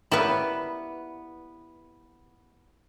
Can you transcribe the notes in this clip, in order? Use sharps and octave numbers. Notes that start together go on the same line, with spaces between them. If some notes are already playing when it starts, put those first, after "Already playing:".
G3 A#3 B3 E4 B4